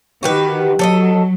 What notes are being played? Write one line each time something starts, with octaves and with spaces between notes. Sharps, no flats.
D#3 F#4 G4 B4
F#3 A4 D5 D#5